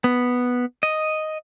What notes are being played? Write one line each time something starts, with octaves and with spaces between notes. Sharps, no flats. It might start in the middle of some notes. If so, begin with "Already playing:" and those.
B3
D#5